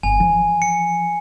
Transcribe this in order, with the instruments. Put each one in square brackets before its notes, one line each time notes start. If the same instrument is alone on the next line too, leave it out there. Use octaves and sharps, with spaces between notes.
[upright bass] G1 [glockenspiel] G#5
[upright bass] E3 F3
[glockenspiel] C#7